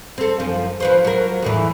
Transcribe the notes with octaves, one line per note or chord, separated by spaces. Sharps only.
C4 A4
F#2 F3
F3 B4 C5
F#3 A#4
E2 A2 E3